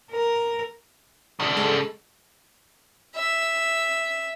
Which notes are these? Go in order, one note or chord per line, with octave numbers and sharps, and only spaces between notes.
A#4
C#3 D4 D#6
G#3 A4
E5